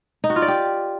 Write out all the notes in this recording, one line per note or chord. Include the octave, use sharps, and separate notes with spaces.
D#4
F#4
F4
D5
G4